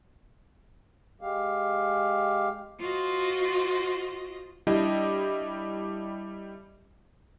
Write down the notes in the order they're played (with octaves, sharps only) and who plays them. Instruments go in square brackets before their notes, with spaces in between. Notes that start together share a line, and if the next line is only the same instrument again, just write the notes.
[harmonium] G#3 G4 F5
[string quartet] F4 F#4 C5 D#5
[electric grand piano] G3 D4 E4 G4 D#5